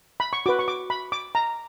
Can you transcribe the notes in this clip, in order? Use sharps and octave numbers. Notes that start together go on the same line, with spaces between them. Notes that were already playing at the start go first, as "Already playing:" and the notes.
B5
C#6
F#4 B4 D6
C#6
D6
B5
D6
A#5